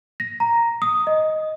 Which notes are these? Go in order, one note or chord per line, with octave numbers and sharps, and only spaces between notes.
A#6
A#5
D#6
D#5